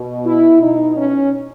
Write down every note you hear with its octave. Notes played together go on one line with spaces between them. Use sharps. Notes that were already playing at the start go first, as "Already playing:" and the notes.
Already playing: B2
E4
B2 D#4
C#4